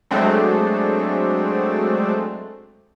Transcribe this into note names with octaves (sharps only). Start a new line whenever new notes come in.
F#3 G#3 A3 C4 D4